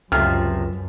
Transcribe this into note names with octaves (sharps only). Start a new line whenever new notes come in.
C#2 F#2 C3 F3 F6